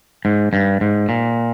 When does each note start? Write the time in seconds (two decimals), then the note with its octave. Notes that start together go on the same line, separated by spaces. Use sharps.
0.25 G#2
0.53 G2
0.81 G#2
1.09 A#2